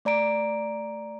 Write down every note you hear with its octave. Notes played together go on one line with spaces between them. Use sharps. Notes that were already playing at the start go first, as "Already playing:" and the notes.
A3 D5 A#5 D7